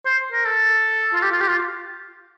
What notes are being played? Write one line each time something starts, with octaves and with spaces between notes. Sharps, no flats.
C5
A#4
A4
F4
G4
F4
G4
F4